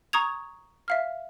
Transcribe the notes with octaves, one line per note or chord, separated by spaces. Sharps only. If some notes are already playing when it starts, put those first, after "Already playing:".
A#5 C#6 D#6 G#6 F7
E5 F5 F6